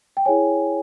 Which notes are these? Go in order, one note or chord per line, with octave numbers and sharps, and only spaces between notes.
G5
E4 G#4 C#5 G#5